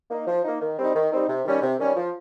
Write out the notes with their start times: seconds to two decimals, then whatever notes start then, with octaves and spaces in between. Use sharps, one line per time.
0.10 A#3 D#4
0.27 F3
0.44 A#3 D#4
0.61 D#3
0.78 G3 C4 D#4
0.94 D#3
1.11 G3 C4 D#4
1.28 C3
1.45 D#3 G3 C#4
1.61 C3
1.79 D#3 G3 C#4
1.96 F3